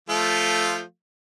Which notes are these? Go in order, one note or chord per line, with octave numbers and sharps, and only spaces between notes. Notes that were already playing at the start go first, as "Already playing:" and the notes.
F3 A3 F4